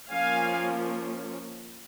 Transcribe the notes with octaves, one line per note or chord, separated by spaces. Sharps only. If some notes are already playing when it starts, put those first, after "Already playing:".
F3 A#3 C#4 F5 G#5